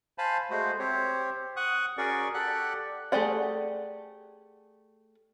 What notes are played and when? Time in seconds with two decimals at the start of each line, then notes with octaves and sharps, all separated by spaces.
0.18 C5 F5 G#5 A5 B5
0.50 G#3 A3 F#4 C5
0.79 C4 G4 C5 C#5
1.56 F#5 C#6 D#6 F#6
1.98 C#4 F#4 G#4 A#4 D5 C#6
2.34 G4 A4 D5 F#5 F#6
3.12 A3 G4 G#4 D5 F#5